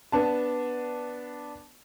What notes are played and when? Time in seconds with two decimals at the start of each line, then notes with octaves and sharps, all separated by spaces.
0.12 B3 D4 A5